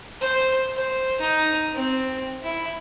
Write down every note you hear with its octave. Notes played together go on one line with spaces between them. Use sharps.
C5
C5
D#4
C4
E4